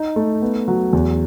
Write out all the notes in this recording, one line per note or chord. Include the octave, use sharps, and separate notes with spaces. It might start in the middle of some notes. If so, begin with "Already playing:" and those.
Already playing: D#4
A3
B3
F#3
E2